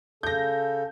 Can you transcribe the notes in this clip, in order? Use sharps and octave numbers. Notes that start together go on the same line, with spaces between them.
C#3 A4 G6 A#6